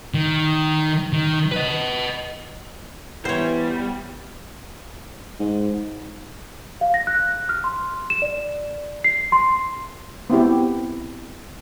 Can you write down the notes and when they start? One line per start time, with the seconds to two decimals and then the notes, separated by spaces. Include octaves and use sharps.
0.14 D#3
1.13 D#3
1.52 B4 D#5
3.25 E3 G3 B3 G4 C5 C#5
5.40 G#2
6.81 F5
6.94 A#6
7.07 F#6
7.49 F6
7.64 C6
8.10 E7
8.22 D5
9.04 C7
9.32 C6
10.30 B3 C4 E4 G4